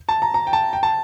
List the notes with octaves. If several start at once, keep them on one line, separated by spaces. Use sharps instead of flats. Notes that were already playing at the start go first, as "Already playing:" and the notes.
A5
A#5
A#5
G5
A5
G5
A5